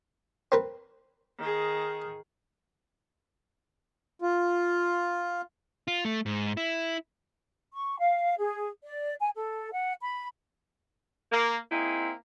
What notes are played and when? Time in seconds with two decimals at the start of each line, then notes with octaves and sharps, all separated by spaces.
0.52 C4 A#4 B4
1.38 D#3 G#4
4.22 F4
5.88 F4
6.05 A3
6.26 G#2
6.57 E4
7.73 C#6
7.99 F5
8.38 G#4
8.84 D5
9.20 G#5
9.34 A4
9.72 F#5
10.01 B5
11.32 A#3
11.71 A#3 C4 D#4 E4 G#4